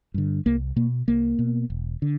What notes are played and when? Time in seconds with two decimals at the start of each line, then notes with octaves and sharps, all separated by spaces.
0.14 G2 D3
0.46 C2 A#3
0.76 B2 A#3
1.08 C2 A#3
1.39 B2
1.70 E1
2.02 D3